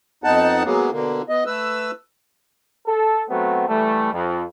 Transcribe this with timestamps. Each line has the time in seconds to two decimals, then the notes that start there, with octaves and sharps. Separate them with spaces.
0.24 F2 B3 D#4 F#5 A5
0.65 F#3 G#3 A#3 B3
0.92 B2 D3 A#3
1.29 B3 D#5
1.46 A3 B4 E6
2.86 A4
3.29 F#3 A3 B3 C4
3.68 E3 G3 A3
4.13 F2